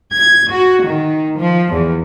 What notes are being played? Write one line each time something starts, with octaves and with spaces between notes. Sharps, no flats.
G#6
F#4
D#3
F3
E2